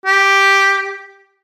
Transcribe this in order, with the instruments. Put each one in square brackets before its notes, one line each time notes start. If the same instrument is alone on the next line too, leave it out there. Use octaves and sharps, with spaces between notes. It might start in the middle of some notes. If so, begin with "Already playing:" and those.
[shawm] G4